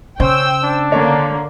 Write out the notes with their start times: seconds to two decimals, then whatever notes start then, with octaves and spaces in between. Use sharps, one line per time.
0.20 C#3 C#4 C5 G5 E6
0.64 D4
0.92 D3 A#3 C#5